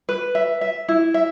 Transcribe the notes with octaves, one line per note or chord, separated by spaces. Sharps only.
B4
E5
E5
E4
E5